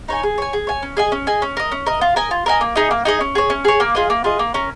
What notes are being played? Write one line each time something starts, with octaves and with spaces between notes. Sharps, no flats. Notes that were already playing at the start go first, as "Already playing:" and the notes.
D#4 C#5 G#5
G#4
C#5 G#5
G#4
C#5 G#5
C#4
G#4 D#5 G#5
C#4
G#4 D#5 G#5
C#4
A#4 D#5
C#4
A#4 D#5
F4
A#4 D#5 G#5
F4
A#4 D#5 G#5
A#3
D#4 G#4 D#5
A#3
D#4 G#4 D#5
C#4
G#4 C#5
C#4
G#4 C#5
A#3
F4 G#4 D#5
A#3
F4 G#4 D#5
A#3
C#4 A#4